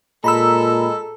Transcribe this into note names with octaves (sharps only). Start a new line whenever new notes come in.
A#2 G#3 A4 A#5 B5 E6